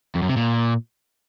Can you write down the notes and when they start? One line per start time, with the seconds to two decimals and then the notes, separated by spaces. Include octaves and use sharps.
0.15 F2
0.22 F#2
0.29 C3
0.37 A#2